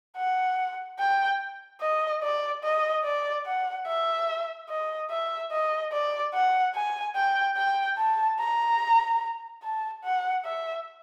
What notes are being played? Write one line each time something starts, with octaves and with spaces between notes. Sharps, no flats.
F#5
G5
D#5
D5
D#5
D5
F#5
E5
D#5
E5
D#5
D5
F#5
G#5
G5
G5
A5
A#5
A5
F#5
E5